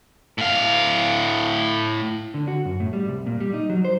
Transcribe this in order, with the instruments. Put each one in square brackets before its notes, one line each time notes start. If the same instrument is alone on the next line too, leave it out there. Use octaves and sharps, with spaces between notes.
[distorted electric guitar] A2 F5
[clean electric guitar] D3
F#4
F#2
A2
G3
C2
A#2
G3
D#4
F#3
C5